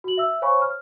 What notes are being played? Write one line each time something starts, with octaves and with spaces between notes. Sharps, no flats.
F#4 F#7
E5 E6
C5 C#5 F5 G#5 B5 C#6
F6